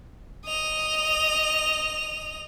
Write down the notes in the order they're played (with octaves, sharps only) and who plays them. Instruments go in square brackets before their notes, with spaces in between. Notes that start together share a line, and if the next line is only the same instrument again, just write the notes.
[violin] D#5 F7